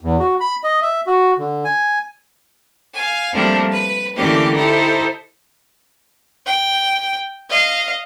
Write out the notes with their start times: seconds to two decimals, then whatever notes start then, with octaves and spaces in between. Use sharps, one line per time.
0.01 E2
0.19 F#4
0.40 B5
0.64 D#5
0.82 E5
1.07 F#4
1.38 D3
1.65 G#5
2.93 F5 G#5
3.33 F3 G3 A3 A#3 C4 D4
3.71 B4
4.15 D3 E3 A3 A#3 C#4 G4
4.53 D#4 E4 G4 A4 C5
6.46 G5
7.50 D#5 F5